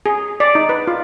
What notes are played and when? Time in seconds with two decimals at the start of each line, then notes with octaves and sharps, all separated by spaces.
0.06 G#4
0.40 D5
0.55 D#4
0.69 B4
0.87 F4